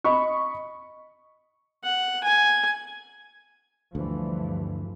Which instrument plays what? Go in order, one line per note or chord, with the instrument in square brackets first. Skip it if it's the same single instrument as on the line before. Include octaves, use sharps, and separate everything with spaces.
[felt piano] D#5 B5 C#6
[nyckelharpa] F#5
G#5
[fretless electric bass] D2 [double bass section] G2 E3 F3